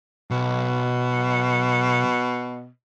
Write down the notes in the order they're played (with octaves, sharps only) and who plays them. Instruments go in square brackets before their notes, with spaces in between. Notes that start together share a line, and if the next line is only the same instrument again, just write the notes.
[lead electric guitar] B1 [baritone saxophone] B2